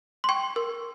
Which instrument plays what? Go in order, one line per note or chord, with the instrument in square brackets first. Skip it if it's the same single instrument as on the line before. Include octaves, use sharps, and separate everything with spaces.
[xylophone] C6
G5 C#6
A#4